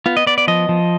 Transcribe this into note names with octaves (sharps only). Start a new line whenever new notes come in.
B3 F4
D#5
B3 D5
D5
F3 D#5
F3